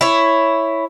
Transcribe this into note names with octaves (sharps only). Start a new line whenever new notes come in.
E4 C#5